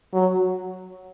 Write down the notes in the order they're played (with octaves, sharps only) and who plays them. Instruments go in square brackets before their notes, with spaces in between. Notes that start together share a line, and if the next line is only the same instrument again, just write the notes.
[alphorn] F#3